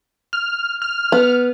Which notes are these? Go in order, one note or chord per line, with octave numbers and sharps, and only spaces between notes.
F6
F6
B3